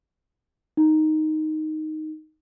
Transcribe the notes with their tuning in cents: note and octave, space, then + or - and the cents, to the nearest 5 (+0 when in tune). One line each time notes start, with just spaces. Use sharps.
D#4 +0